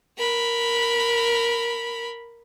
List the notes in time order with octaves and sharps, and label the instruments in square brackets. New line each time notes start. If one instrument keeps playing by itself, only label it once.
[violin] A#4 B5